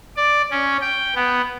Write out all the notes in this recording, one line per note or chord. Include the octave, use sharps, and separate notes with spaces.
D5
C#4
G5
B3